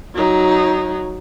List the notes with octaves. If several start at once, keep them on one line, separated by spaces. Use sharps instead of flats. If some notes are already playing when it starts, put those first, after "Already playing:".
F#3 D#4